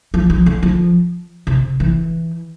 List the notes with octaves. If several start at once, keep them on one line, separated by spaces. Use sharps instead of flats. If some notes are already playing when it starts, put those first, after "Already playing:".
F3
F3
D3
F3
C3
E3